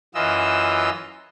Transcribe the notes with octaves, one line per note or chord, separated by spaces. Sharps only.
F#2 E3 F4 D#5 E6